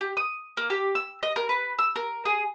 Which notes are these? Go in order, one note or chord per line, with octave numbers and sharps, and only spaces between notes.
G4
D#6
A#3
G4
E6
D#5
A#4
B4
E6
A#4
G#4